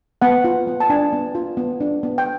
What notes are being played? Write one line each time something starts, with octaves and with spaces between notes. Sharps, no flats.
B3 F#5
F4
B3
A5
D4 G#5
B3
F4
B3
D4
B3
G5